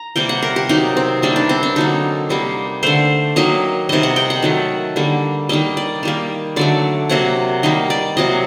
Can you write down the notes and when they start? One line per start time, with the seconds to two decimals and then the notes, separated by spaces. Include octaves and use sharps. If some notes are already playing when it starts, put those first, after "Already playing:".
Already playing: A#5
0.16 C3 G3 A#3 G5
0.29 F#5
0.42 A#4
0.56 G4
0.69 C3 D#3 F#3 D#4
0.97 C4
1.22 C3 G3 A#3 D4
1.36 D4
1.49 C4
1.63 D4
1.76 D3 F#3 A#3 D#4
2.30 C3 G3 A#3
2.83 D3 A3 C5
3.36 D#3 F#3 A#3 D#5
3.89 C3 D#3 G3 D#5
4.03 F#5
4.16 G5
4.30 F#5
4.42 D#3 F#3 A3
4.96 D3 G3 A#3
5.49 D#3 G3 A#3 D#5
5.77 D5
6.03 D#3 G3 A#3
6.56 D3 F#3 A3 D5
7.09 C3 F#3 A#3 F#5
7.63 D#3 G3 A#3 D#5
7.90 D5
8.17 C3 F#3 A#3 D#5